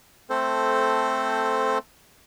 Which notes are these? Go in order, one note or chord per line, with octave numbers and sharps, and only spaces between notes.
A3 C4 A4 C5